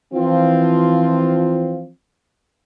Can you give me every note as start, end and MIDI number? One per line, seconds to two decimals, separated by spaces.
0.13 1.88 52
0.13 1.88 53
0.13 1.88 60
0.13 1.88 65